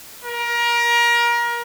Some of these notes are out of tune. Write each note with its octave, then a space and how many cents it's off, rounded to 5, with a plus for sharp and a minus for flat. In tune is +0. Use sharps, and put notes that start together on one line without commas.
A#4 +25